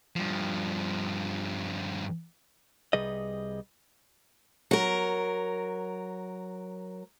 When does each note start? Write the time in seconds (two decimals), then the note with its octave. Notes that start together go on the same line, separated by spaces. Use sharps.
0.16 G2 F3
2.93 C2 C3 G3 G#4 B4 D#5
4.71 F#3 A#4